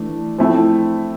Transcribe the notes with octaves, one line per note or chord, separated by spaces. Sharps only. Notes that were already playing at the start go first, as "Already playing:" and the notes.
Already playing: E3 A3 D4
F3 A3 C4 E4